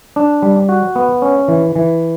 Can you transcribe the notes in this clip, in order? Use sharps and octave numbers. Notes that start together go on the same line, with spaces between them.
D4
G3
F#4
B3
C#4
E3
E3